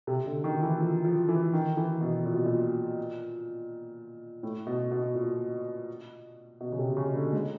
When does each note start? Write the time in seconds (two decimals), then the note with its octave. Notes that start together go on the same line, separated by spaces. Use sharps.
0.07 C3
0.26 D3
0.44 D#3
0.62 E3
0.80 F3
1.05 F3
1.29 E3
1.53 D#3
1.77 E3
2.01 B2
2.25 A#2
2.35 B2
2.45 A#2
4.43 A2
4.67 B2
4.91 B2
5.15 A#2
6.61 B2
6.72 C#3
6.79 C3
6.97 C#3
7.16 D3
7.33 G#3